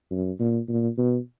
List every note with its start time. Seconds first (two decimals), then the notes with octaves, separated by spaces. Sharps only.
0.11 F#2
0.39 A#2
0.68 A#2
0.98 B2